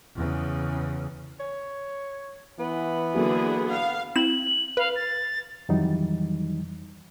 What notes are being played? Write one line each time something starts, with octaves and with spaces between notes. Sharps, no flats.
E2 C#3
C#5
E3 B3
D3 F#3 A#3 D4 F#4 G#4
F5
C4 E4 E7 F#7
B4 F5
A6
F2 D#3 E3 F#3 G3 D#4